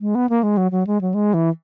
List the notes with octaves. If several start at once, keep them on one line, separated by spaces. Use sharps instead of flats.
G#3
B3
A#3
G#3
F#3
F#3
G#3
F#3
G#3
E3